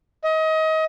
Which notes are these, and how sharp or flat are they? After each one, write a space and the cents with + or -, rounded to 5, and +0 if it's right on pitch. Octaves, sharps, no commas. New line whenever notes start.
D#5 +30